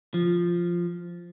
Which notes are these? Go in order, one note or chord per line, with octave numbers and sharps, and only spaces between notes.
F3